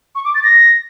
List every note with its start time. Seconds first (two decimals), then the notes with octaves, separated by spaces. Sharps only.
0.15 C#6
0.25 D6
0.35 A6
0.44 A#6